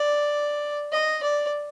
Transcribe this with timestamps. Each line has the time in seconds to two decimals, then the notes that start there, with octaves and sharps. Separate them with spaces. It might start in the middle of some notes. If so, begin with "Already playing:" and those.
Already playing: D5
0.92 D#5
1.23 D5